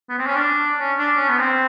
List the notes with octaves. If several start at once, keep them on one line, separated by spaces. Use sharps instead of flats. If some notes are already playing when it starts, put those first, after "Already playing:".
B3
C4
C#4
D4
C#4
D4
C#4
B3
C4